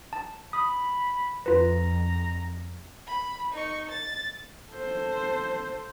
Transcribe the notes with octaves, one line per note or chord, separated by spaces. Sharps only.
A5
B5 D#6
F2 F4 B4 A#5
B5
D#4 C#6
A6
A4 C5